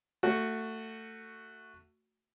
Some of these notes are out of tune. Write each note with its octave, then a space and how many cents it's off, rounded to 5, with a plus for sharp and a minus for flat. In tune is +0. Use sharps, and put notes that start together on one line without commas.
A3 +20 F#4 +0